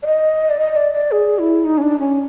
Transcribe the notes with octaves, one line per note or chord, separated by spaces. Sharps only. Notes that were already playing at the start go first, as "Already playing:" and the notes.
D5
D#5
D5
D#5
D5
D5
G#4
E4
D#4
C#4
D4
C#4